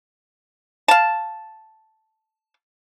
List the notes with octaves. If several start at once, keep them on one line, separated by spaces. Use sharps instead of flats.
F5 A5